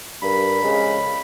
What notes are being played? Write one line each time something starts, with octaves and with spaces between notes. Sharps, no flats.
G2 A#4 B5
F2 C#3 G#3